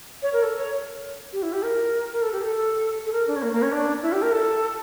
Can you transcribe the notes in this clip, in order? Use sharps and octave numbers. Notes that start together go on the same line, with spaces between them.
C#5
A#4
A4
C#5
G4
E4
G4
A#4
A#4
A4
G4
A4
A4
A#4
D4
C#4
A#3
A#3
C#4
D4
E4
G4
A#4
A4